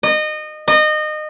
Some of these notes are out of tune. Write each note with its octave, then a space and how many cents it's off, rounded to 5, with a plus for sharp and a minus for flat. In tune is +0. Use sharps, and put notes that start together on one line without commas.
D#5 -25
D#5 -25